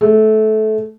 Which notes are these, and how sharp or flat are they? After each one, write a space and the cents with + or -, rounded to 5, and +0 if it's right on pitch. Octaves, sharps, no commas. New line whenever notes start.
A3 -20